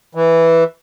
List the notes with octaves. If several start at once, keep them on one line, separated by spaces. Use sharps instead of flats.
E3